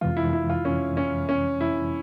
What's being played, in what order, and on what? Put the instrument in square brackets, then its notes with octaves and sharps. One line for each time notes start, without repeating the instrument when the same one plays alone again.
[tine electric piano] F2 C3 E3 G#3 [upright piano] F4
[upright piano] E4
E4
F4
C#4
C#4
C#4
E4